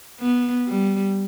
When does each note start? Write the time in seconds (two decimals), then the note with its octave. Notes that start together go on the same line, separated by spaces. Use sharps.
0.20 B3
0.68 G3